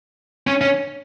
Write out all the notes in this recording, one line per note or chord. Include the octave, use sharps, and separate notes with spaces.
C#4
C#4